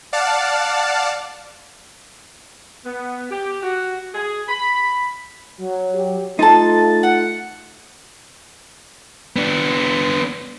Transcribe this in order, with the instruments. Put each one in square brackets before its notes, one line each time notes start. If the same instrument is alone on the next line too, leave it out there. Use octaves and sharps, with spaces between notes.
[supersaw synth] D5 F5 F#5 A5
[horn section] B3
G4
F#4
G#4
B5
[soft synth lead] F#3
[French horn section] G4
[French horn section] A3 F4 [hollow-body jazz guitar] D#4 A4 [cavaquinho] C5 A5 [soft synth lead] A6
[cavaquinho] F#5 [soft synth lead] C#7
[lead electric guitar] B3 D4